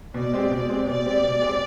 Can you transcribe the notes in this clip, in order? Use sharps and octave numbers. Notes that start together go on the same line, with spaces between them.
B2 D5
G#3 C4 G4
B2
G#3 C4 G4
B2 D5
G#3 C4 G4
B2
G#3 C4 G4